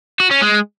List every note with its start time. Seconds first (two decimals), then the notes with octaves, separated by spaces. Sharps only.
0.20 F#4
0.31 C#4
0.42 G#3